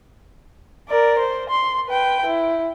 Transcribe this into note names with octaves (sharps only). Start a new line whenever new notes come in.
A#4 D5
C5
C6
B4 G5
E4